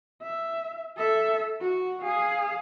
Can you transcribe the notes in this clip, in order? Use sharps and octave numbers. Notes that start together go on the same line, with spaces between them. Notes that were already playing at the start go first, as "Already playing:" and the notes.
E5
A4 E5
F#4
G#4 F5